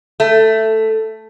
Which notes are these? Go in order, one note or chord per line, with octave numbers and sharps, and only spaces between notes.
A3